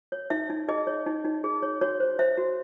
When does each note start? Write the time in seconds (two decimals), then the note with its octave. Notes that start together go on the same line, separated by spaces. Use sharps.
0.12 C#5
0.30 D#4 E5
0.50 D#4
0.68 G#4 D#5
0.87 C#5
1.06 D#4
1.25 D#4
1.44 G#4
1.62 C#5
1.81 F#4 C#5
2.00 C5
2.19 C5 E5
2.37 F#4